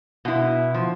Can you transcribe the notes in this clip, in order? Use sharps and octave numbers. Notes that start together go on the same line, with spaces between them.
B2 E4
F3